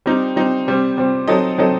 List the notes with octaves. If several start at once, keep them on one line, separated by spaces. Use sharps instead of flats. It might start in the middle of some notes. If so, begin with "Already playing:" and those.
G3 C4 D#4
G3 C4 D#4
C3 G3 C4
C3 G3 C4
F#3 C4 D#4 A4 D#5
F#3 C4 D#4 A4 D#5